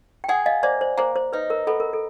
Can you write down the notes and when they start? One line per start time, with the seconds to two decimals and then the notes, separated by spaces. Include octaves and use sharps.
0.24 G5
0.28 G#4 F#5 G#5
0.46 D#5 F5
0.63 A#3 C5 D5
0.81 C5
0.97 A#3 C5
1.16 C5
1.33 D#4 B4
1.50 A#4
1.67 B3 A4
1.80 A#4
1.93 A4